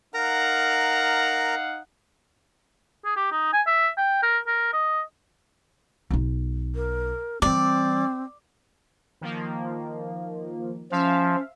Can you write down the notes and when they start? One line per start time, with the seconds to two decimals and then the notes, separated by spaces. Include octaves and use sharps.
0.14 D#4 A#4 F5 F#5 A#5
3.05 G#4
3.16 G4
3.32 D#4
3.53 G#5
3.67 E5
3.98 G5
4.23 A#4
4.47 A#4
4.73 D#5
6.10 B1 D#4
6.75 A#4
7.42 E3 G3 C4 D5
9.21 D#3 F3 A#3
10.92 F3 C#4 E5 F5